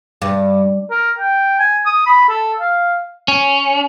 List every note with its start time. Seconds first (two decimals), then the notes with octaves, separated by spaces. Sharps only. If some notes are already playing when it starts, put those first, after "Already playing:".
0.22 G2
0.90 A#4
1.19 G5
1.59 G#5
1.86 D#6
2.06 B5
2.28 A4
2.60 F5
3.28 C#4